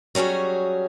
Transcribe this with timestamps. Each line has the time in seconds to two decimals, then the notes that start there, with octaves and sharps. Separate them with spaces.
0.15 F#3 G3 C#4 F#4 G#4